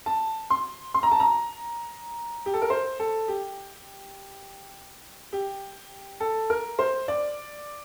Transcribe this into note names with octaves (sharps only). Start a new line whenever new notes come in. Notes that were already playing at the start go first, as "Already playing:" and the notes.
A5
C6
C6
A#5
A5
A#5
G4
A4
A#4
C5
A4
G4
G4
A4
A#4
C5
D5